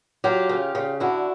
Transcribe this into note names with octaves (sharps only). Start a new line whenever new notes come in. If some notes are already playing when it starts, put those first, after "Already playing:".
F#3 F4 G4
C#3
C#3
D3 E4 F#4